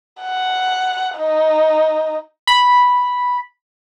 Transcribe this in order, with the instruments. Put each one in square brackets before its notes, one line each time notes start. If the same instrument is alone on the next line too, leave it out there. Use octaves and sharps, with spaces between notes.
[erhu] F#5
D#4
[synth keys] B5